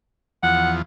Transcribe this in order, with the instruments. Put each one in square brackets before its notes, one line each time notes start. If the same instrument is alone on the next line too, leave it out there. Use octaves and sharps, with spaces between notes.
[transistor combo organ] E2 F3 [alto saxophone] F#5